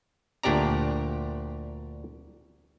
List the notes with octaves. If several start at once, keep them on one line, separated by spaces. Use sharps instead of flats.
D2 A#2 D4 G4 D5 A#5